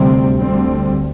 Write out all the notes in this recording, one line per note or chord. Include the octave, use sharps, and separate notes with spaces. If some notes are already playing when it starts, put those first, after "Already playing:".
Already playing: D2 C3 G3 C4
D2 D3 G3 C4